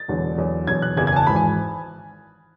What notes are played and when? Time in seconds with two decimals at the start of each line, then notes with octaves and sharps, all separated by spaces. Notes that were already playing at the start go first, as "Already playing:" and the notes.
Already playing: A6
0.08 E1 E2 D3 F#3
0.37 E2 D3 F#3
0.67 E2 B2 F#3 G#6
0.82 F#6
0.97 F#1 E2 C#3 E3 G#6
1.07 G#6
1.12 G#5
1.16 A5
1.27 G#1 G#2 E3 B5
1.36 G#5